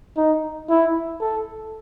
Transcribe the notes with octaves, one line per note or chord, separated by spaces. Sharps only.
D#4
E4
A4